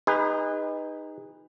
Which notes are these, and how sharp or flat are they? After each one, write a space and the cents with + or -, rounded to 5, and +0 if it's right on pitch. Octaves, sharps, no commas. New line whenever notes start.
D#4 +0 G#4 -40 B4 +0